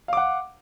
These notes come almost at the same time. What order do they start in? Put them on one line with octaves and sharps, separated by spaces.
F5 D6 F#5